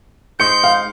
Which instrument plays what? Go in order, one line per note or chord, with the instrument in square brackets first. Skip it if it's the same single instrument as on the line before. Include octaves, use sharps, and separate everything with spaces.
[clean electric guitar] G#3 D#4 C5 [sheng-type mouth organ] G6 [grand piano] C#7
[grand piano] F5